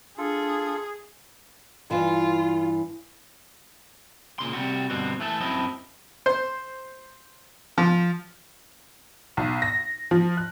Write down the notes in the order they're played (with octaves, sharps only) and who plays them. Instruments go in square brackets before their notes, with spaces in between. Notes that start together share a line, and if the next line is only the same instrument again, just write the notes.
[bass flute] D4 [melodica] F4 A4 [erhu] G#4
[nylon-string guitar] G2 E3 [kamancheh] F4
[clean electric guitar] A#2 C#3 C6
C3 G3 F#4
G2 B2 D3 C4 F#4
E3 A3 G#4 A4
F#2 C4 E4 A4 D#5
[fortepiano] C5
F3
[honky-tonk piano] B1
A#6
F3
F#6